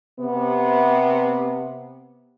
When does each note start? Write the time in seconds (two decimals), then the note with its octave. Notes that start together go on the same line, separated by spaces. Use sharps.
0.19 C3 B3